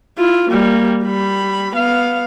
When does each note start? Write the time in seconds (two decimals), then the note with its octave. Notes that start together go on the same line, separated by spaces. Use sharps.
0.18 E4 F4
0.50 G3 A#3
1.05 G3 B5
1.76 B3 F5